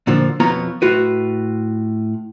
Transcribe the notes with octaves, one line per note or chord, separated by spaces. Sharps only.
A#2 D3 F3
F2 B2 B3 F4 C#5 A#5
A2 F4 F#4 B4